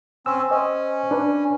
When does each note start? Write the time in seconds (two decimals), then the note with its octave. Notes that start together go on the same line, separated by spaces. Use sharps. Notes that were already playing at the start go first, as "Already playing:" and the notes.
0.26 C4 C#4 E6
0.51 C#4 C5 D#5
1.11 D4 B4